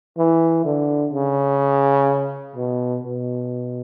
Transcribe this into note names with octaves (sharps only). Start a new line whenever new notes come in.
E3
D3
C#3
B2
B2